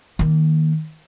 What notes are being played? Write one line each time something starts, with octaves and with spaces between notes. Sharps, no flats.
D#3 A#3